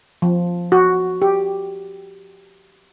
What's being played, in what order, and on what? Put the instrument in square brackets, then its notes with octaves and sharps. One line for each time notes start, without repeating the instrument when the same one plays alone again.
[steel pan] F3
F#4
G4